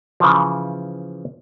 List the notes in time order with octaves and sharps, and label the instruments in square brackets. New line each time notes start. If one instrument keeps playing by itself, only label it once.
[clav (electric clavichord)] C#3 E3 F3